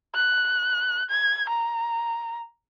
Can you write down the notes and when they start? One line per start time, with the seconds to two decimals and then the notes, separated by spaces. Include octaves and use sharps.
0.15 F#6
1.10 G#6
1.49 A#5